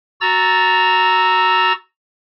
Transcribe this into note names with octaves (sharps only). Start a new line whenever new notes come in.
F#4 A#5 E6 A6